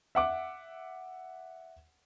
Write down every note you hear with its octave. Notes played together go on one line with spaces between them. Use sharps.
E5 F#5 D6